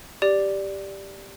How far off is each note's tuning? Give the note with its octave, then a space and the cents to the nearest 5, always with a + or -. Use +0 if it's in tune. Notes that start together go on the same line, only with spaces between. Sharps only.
G4 +0 D5 +0